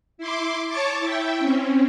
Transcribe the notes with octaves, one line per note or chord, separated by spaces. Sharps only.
E4 C6 D6
C#5 A5 C#6 D6 A6
E4 E5 G5
C4 C#4